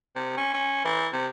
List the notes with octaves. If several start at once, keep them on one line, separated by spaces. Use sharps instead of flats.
C3
C#4
C#4
E3
C3